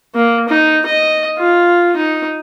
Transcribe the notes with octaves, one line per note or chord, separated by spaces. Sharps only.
A#3
D#4
D#5
F4
D#4